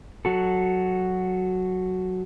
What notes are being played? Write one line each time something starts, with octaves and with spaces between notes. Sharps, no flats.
F#3 F#4 A4